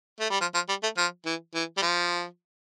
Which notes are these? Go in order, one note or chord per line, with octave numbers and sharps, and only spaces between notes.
A3
G3
F3
F3
G3
A3
F3
E3
E3
G3
F3